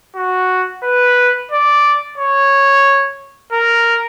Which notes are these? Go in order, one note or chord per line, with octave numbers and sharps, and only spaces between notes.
F#4
B4
D5
C#5
A#4